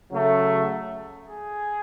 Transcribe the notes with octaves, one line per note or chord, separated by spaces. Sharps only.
C#3 F#3 A3
G#4